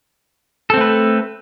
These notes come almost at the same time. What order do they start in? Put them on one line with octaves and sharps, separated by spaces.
A4 C4 A3 B4